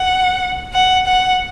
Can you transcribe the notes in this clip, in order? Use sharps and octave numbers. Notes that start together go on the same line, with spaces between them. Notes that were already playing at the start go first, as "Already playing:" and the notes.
Already playing: F#5
F#5
F#5